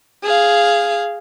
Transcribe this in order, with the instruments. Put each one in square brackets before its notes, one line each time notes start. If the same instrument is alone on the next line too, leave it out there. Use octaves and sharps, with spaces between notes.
[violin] G#4 F5